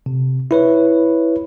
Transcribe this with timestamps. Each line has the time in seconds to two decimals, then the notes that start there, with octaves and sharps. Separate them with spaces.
0.06 C3
0.51 E4 B4 C#5